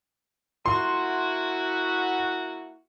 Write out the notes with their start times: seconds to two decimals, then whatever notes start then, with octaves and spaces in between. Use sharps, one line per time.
0.66 A#3 E4 F#4 C6